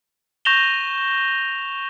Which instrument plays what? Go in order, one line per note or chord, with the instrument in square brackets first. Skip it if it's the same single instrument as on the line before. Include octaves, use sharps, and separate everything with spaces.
[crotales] C#6 G6 A#6 E7 F7 G7